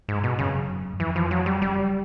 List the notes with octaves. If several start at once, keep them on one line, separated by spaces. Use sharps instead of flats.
G#2
B2
F#1 F#2 C#3
F#2
F2 E3
F3
F#3
G3
F#1 F#2 G3